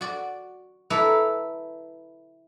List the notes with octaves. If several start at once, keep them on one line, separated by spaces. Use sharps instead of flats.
F#4 D5
E4 A4 B4 D5 E5 A#5